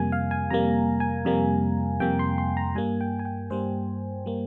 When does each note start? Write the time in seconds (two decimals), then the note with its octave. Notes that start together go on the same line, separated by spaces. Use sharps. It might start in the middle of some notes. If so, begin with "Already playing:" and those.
Already playing: F2 C3 G3 A#3 G#5
0.12 F5
0.31 G#5
0.50 F2 C3 G3 A#3 A#5
1.00 G#5
1.25 F2 C3 G3 A#3
2.00 F2 C3 G3 A#3 G5
2.19 C6
2.38 C6
2.57 A#5
2.75 G2 G3 A#3 G#5
3.01 G5
3.19 G#5
3.25 G5
3.50 G2 G3 A#3 C5
4.26 G3 A#3